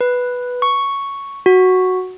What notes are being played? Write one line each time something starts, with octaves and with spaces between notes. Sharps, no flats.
B4
C#6
F#4